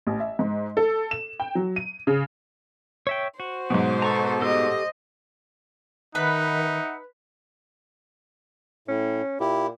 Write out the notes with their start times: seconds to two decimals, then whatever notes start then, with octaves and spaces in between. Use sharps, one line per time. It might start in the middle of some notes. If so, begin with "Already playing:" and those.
0.07 A1
0.20 E5
0.39 G#2
0.77 A4
1.11 E7
1.40 G5
1.55 F#3
1.76 D#7
2.07 C#3
3.07 C#5 E5 G5
3.40 F#4 C5
3.70 G#2 B2 F#3
4.02 A4 A#5 C#6
4.42 G4 A4 D#5
6.15 D#3 D#4 B4 E5 F#5
8.88 A2 C#4
9.40 A#2 E4 G4